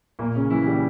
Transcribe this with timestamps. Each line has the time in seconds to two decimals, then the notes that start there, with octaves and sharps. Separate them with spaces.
0.19 A#2 A#3
0.35 C#3 C#4
0.50 E3 E4
0.67 G3 G4